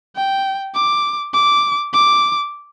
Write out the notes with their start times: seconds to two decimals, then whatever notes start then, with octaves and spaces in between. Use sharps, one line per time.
0.16 G5
0.75 D6
1.34 D6
1.94 D6